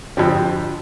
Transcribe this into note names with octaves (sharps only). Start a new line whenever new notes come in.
F2 D3 F3 G4